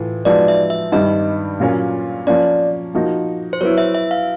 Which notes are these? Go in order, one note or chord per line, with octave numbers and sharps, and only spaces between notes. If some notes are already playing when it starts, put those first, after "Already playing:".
Already playing: A2 E3 F4
F3 G#3 B3 D#4 F#4 D5
E5
E5
G2 D#3 G3 D#5
A#2 F#3 A#3 C#4 F4
F3 A#3 C#4 D5
F3 A#3 D#4 F#4
C5
F#3 B3 E4 C#5
E5
E5
F5